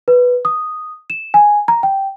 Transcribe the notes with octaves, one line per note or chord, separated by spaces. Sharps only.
B4
D#6
E7
G#5
A#5
G5